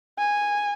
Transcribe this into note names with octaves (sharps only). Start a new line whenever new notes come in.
G#5